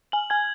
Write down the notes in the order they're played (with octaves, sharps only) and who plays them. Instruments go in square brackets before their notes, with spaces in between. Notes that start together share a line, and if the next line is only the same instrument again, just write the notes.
[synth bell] G#5 [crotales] F#7
[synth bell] G#5 [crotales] G#6